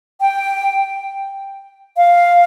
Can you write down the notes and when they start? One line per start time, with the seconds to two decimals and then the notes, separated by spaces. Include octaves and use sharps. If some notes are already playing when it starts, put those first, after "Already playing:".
0.21 G5
1.97 F5